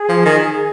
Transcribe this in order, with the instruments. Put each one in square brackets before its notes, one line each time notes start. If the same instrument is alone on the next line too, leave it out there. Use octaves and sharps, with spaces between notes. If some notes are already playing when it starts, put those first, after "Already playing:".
Already playing: [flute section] G#4
[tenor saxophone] F3
D#3